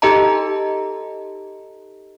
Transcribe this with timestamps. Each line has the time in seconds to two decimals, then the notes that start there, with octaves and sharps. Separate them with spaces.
0.02 D#4 G4 A4 D#5 A5 A#5